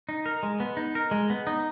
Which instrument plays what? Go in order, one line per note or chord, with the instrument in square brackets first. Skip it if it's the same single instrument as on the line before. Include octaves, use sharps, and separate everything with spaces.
[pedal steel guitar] D#4
A#4
G#3
B3
D#4
A#4
G#3
B3
D#4